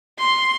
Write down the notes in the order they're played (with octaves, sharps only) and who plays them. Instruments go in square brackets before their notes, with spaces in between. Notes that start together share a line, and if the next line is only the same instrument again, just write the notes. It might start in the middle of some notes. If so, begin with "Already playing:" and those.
[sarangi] C6